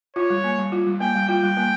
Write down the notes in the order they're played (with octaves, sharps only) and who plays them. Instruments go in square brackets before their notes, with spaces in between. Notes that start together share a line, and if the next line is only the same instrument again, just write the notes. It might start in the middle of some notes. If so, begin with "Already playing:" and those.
[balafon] F4 [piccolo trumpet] C#5
[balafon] G3
A#3
G3
F4
G3
[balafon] A#3 [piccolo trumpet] G5
[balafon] G3
[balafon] F4 [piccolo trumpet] G5
[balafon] G3
A#3